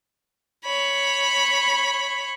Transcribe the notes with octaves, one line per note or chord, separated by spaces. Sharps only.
C#5 B5